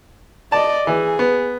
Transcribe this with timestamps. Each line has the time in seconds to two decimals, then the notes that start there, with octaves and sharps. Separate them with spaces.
0.52 D5 D#5 A5
0.87 E3 G#4
1.19 B3